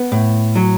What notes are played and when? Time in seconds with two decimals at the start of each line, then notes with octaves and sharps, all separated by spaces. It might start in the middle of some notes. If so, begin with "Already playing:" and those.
Already playing: B3
0.12 A2
0.56 F#3